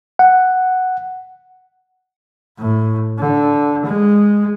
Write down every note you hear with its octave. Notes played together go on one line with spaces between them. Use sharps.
F#5
A2
D3
G#3